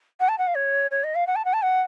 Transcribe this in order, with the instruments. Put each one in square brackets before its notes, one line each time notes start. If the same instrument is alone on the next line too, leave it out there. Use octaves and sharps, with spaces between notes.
[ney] F#5
A5
F#5
F5
C#5
C#5
D#5
F5
F#5
A5
F#5
A5
F#5